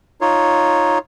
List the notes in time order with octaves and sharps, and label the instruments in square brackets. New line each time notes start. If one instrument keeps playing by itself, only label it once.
[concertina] D#4 F4 C#5